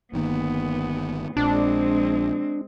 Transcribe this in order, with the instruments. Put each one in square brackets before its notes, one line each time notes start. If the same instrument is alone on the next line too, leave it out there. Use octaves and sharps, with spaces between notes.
[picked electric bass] G1 D#3 A#3 [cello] B3
[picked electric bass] A#1 [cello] G#3 C4 [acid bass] D4